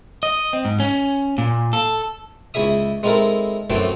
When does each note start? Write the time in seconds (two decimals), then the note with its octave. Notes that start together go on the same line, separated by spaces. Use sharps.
0.23 D#5
0.53 C4
0.65 G#2
0.80 C#4
1.38 A#2
1.73 A4
2.54 C#2 E4 G#4 E5 D#6
3.03 G#3 C4 D#4 E4 A4 A#4
3.70 F#2 A2 E3 C4 G5 A5